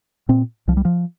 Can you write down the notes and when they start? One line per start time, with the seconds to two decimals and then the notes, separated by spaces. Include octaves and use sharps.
0.29 A#2 C4
0.68 C2 F3
0.77 G3
0.85 F3